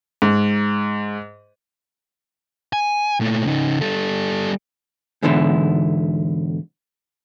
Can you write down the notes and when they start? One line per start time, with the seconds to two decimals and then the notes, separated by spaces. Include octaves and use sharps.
0.22 G#2
2.73 G#5
3.21 A#2 A3
3.45 C#3 D#4
3.81 G3 A4
5.23 G#2 B2 D3 E3 E4